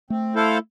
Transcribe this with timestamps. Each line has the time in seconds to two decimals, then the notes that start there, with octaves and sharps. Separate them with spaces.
0.10 A3 C4
0.35 E4 A4 C5 F5